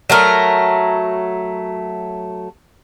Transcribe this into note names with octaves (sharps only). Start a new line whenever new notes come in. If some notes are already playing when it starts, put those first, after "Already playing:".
F#3 A3 A#4